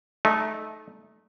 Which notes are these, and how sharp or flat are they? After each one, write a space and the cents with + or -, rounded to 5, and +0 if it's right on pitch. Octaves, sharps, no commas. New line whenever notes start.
A3 -20 D#4 +0